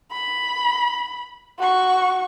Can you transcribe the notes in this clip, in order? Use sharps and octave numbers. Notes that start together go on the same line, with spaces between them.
B5
F#4 C#6